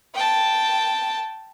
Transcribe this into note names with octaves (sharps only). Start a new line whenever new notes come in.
G5 A5